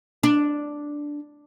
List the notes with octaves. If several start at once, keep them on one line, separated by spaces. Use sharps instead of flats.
D4